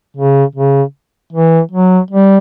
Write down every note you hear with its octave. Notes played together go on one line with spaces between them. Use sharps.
C#3
C#3
E3
F#3
G3